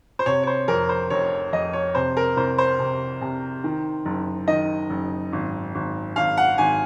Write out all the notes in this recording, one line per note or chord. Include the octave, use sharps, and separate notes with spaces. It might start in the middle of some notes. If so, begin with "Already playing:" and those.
C5
C3 C#5
C#5
C5
F2 A#4
C5
F1 C#5
F1 D#5
C#5
C3 C5
A#4
C2 C5
C5
C3
C3
D#3
F#1
D#3 D#5
F#1
G#1
G#1
G#1 F5
F#5
G#1 G#5